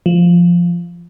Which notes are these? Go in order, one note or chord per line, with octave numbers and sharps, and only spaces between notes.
F3